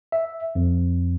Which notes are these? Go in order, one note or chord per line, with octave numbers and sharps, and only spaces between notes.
E5
F2